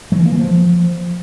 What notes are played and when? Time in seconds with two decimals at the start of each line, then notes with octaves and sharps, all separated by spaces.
0.12 F#3
0.19 E3
0.26 A#3
0.32 E3
0.39 F3